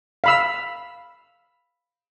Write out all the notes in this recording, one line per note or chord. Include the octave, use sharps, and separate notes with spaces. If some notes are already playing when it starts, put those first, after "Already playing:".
F5 B5 E6